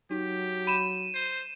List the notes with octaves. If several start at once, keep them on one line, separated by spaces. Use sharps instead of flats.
F#3 D#4 G4
B5 D#7 E7
C5